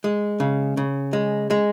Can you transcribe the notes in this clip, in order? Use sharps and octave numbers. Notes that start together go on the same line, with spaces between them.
G#3
C#3
C#3
G#3
G#3